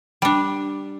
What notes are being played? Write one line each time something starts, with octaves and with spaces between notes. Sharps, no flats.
G3 D4